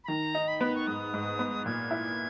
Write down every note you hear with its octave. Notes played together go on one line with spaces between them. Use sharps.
B5
D#3 A#5
D#4
B5
B3
C#6
G#2 D#6
G#2
B3
A#2 G#6
E4